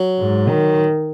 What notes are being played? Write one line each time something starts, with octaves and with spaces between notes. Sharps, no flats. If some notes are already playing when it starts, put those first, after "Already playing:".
Already playing: F#3
G#2
D#3